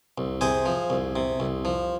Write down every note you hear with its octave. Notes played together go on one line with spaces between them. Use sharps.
C2
C3 G#4 C5
F3
C2
C3
C2
F3